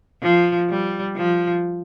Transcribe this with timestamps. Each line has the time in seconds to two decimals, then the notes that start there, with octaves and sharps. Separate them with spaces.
0.22 F3
0.69 G3
1.16 F3